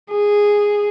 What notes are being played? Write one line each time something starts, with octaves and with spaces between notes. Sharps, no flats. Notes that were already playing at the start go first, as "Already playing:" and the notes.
G#4